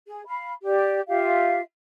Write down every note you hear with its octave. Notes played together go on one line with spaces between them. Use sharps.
G#4
F5 B5
G4 D5
F4 G4 E5 F5